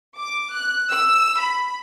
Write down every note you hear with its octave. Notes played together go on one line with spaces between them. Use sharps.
D6
F#6
E6
B5